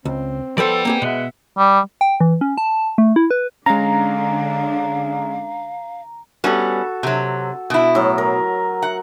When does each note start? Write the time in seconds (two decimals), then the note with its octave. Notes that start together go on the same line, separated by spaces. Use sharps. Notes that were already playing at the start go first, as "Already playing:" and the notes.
0.05 C#2 C4
0.58 F3 B3 A4 B4 C5 D5 G5
0.85 A#3 C4 G#4
1.02 B2 G#3 E5 F#5
1.58 G3
2.01 G5
2.20 E3
2.41 C#4
2.58 A5
2.98 A3
3.16 E4
3.31 B4
3.66 D3 G#3 C#4 D4 F5 A#5
6.44 G3 B3 C#4 F#4 A4
7.03 C3 F#3
7.70 B2 E4
7.95 A2 F#3
8.18 A#4
8.82 F#5